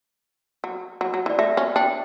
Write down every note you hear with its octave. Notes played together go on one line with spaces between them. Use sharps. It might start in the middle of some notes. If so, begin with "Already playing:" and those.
F#3
F#3
F#3
E3
D5
A3 E5
C#4
D4 G5